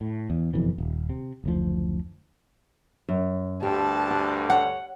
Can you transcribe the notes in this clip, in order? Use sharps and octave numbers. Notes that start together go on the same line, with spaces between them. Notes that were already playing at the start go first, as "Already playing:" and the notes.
A2
E2
F#1 F2 B2 E3
D#1
C3
F#1 D2 F3
F#2
D2 G2 D3 G4 A5
F#5
C#5 F#5